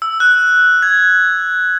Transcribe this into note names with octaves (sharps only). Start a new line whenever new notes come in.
E6
F#6
G#6